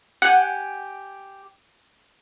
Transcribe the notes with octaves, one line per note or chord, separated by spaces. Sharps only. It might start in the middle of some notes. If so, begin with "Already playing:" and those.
G4 F#5 G#5